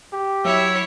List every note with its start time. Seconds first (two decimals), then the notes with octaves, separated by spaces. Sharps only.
0.13 G4
0.45 F#3 E4 C#5 E5